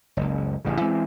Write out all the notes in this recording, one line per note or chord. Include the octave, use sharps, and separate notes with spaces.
F#1 C#2
A1 G2 C#3
E3 G#3 C4